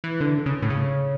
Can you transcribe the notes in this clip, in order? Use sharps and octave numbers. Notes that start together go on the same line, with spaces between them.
E3
D3
C#3
A2
C#3